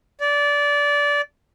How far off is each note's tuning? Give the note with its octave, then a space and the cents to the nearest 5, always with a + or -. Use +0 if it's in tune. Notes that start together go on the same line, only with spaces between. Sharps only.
D5 -20